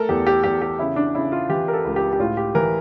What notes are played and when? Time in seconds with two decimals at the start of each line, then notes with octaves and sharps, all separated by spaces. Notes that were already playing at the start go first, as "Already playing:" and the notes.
Already playing: A3 A4 A#4
0.09 E2 G4
0.27 G4
0.44 E2 G4
0.62 G4
0.79 C#3 E4
0.96 D4
1.14 C#3 E4
1.32 F4
1.49 E3 G4
1.68 A#4
1.73 A4
1.84 C#2
1.96 G4
2.12 G4
2.19 A2 F4
2.37 G4
2.55 E3 A#4